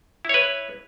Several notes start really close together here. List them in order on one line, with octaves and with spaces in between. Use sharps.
E4 C#5 B4